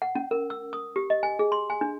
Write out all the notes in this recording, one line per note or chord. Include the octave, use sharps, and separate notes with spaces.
F#5
C#4
A#4
E6
D#6
G4
D#5
G#5
G#4
C6
G#5
D4